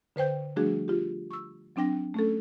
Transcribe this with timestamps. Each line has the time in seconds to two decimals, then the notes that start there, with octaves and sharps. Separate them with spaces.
0.16 D3 B4 C5 G5 G6
0.56 F3 G3 A3 D4 F#4 G#4
0.88 F4 G4
1.31 C#6 E6
1.76 F#3 C4 D4 G5 A#6
2.14 A3 C#4 A4